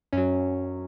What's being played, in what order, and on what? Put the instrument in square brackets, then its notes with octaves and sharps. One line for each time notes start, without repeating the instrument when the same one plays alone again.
[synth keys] F#2 F#3 C#4